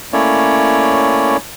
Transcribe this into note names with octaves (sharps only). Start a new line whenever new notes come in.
A3 A#3 C#4 E4 C#5 D5